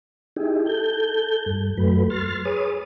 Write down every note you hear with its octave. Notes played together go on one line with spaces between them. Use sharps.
D#4 E4 G4 G#4
A4 G6
G2
F#2 F#3 A3 B4
C6 F6 A6
G#4 B4 C#5 D#6